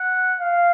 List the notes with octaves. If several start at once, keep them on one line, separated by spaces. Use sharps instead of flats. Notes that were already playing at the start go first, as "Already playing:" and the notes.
Already playing: F#5
F5